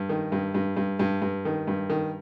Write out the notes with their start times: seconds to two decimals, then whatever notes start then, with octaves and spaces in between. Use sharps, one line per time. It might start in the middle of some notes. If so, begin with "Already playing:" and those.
Already playing: G2
0.09 D#3
0.32 G2
0.54 G2
0.77 G2
0.99 G2
1.22 G2
1.45 D#3
1.67 G2
1.90 D#3